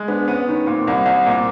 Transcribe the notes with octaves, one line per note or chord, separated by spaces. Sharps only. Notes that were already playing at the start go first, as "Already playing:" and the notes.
Already playing: G#3
B3 D4
B3 C#4
D#3 C#4
A#2 C4
C2
C2
A#2